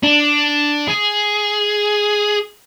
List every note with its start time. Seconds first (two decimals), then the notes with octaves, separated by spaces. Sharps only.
0.03 D4
0.88 G#4